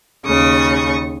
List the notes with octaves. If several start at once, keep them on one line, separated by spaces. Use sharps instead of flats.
D#2 C#3 C#6 D#6